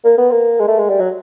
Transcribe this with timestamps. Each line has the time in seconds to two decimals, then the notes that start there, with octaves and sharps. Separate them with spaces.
0.04 A#3
0.18 B3
0.31 A#3
0.60 G#3
0.68 A3
0.79 G#3
0.89 G3
1.00 F#3